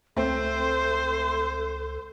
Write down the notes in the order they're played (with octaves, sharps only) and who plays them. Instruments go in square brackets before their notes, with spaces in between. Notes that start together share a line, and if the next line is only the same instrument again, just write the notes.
[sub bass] C#2 [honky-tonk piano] A3 C4 [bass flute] A4 [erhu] C5